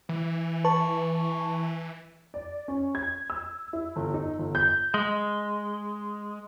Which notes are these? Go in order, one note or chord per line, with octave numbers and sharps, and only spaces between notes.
E3
B4 A5 C#6
D5
C#4
G#6
E6
E4
G1
D#4
G1
G6
G#3